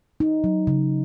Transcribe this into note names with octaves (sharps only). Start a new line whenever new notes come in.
D#4
F#3
C#3